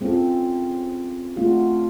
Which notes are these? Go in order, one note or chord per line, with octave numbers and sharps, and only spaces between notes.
G#3 C4 C#4 F4 A4
G#3 A3 C4 D4 F4 F#4